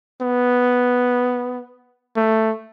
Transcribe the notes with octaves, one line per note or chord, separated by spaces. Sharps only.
B3
A3